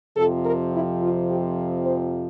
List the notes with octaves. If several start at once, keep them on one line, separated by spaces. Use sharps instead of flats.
F2 C3 F3 A4
A#4
E4
F4
G4
C5